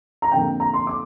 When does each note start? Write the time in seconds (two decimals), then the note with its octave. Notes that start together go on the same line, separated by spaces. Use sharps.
0.22 A#5
0.32 F2 D3 A#3 G5
0.60 A#5
0.74 C6
0.87 D6